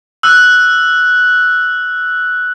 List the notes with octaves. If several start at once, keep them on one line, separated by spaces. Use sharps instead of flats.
E6 F#6